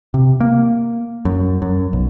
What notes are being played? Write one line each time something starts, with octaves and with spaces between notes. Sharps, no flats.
C3
A#3
F#2
F#2
B1